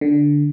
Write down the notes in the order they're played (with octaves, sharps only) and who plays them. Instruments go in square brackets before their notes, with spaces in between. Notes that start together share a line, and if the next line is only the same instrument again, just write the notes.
[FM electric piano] D3